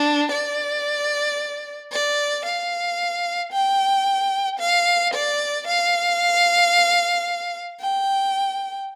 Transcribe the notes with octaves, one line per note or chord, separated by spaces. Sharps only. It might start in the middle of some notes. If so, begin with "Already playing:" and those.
Already playing: D4
D5
D5
F5
G5
F5
D5
F5
G5